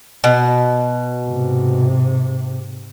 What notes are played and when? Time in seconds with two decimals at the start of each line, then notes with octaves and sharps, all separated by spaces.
0.24 B2
1.25 G#2 C3